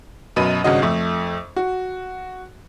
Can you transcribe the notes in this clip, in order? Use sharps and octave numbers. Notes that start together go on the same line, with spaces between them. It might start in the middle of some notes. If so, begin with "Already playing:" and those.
F#2 B2 D#5 B5 D#7
G#1 G2 C#3 F#4 D#5
F2 A3 E5
F#4